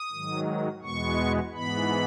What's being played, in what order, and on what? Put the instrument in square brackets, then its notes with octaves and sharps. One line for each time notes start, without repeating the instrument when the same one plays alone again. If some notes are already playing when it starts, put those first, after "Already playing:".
Already playing: [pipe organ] D#6
G#2 D#3 F#3
E2 B2 G#3 B3 C#6
G#2 E3 B3 B5